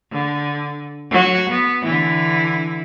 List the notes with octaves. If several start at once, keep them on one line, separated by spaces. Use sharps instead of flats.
D3
F#3 F#4
B3
D3 E3 E4